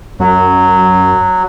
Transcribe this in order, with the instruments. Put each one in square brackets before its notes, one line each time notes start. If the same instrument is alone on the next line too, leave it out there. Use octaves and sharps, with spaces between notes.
[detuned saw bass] F#2 [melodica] F#3